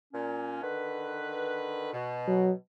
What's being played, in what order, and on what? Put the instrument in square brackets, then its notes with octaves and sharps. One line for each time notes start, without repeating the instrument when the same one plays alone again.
[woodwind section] A#2 C#4
D3 D#3 B4
B2
[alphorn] F#3